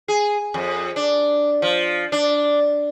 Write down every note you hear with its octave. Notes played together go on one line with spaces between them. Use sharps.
G#4
F2
D4
F3
D4